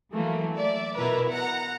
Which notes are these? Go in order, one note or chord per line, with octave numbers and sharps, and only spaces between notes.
E3 F#3 A3 A#3
D5 E5
B2 E4 A#4 B4
F#5 A#5